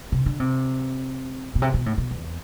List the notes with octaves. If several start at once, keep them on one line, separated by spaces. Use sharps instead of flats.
C3
D3
C3
B2
C3
B2
A2
B2
E2